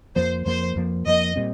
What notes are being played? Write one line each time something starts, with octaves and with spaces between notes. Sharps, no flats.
F2 F3 A#3 C5
F2 F3 A#3 C5
F2 F3 A#3
F2 F3 A#3 D#5
A#2 G3 C4